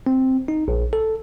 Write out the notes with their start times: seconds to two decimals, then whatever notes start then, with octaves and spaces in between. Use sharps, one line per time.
0.07 C4
0.48 D#4
0.68 A#1
0.93 A4